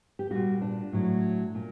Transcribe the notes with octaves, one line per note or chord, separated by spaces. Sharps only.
G4
A#2 G3 F#4
D4
A2 F#3
A#2